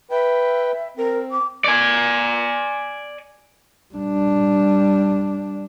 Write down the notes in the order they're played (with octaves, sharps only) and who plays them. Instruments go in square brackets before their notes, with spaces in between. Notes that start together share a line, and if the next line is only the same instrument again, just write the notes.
[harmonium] B4 G5 [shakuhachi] E5
[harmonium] C4 [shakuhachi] A#4
[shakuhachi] D6
[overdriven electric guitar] D5 G#5
[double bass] G3 D4